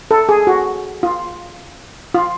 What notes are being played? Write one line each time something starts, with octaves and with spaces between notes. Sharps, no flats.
A4
G#4
F#4
F4
F4